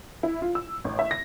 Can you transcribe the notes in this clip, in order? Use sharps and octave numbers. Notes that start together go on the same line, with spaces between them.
E4
F4
E6
A1
E5
A#6